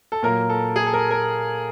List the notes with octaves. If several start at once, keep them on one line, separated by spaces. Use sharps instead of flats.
A4
A#2 F#3 A#3 A#4
A4
G#4
A4
A#4
A#4